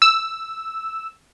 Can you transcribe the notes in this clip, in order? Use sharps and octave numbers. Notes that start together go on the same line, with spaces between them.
E6